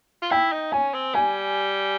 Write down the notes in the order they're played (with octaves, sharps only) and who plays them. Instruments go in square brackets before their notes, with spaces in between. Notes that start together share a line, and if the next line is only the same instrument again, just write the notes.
[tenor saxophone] F4
[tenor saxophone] E4 [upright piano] G5
[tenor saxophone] D#4
[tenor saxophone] C#4 [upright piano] G#5
[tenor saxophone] C4
[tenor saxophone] G3 [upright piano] G#5